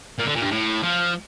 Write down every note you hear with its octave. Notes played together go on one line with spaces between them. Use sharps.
A#2
D3
A#2
G2
A2
F3